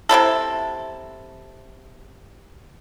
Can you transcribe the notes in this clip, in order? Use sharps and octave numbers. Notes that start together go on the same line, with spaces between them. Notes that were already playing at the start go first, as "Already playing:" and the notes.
C3 G3 E4 A4